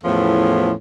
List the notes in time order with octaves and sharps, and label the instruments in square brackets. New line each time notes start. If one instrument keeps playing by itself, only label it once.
[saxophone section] E2 A2 F3 A3 B3 C#4